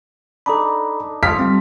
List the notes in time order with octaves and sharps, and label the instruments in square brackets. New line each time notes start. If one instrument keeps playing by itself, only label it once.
[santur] D4 D#4 [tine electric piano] A4 A#5 B5
[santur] F4 A4 [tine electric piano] F5 D#6 F6 [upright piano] B6
[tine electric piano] G3 C4